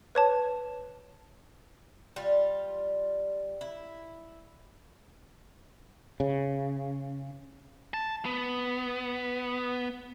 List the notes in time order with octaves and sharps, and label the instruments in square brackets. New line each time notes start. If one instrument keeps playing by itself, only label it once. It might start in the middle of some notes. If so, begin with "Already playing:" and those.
[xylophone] B4 C#5 A5
[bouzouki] G3 F4
E4
[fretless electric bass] C#3
[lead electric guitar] A5
B3